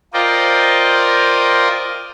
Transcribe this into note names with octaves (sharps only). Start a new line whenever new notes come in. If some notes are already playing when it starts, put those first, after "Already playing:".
F4 A#4 C5 D5 D#5 G5